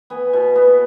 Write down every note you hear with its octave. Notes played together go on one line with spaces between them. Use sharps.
B3 G#5
B2
B3